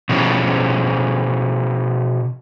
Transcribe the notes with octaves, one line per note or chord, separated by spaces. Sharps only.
B2 F3 C#4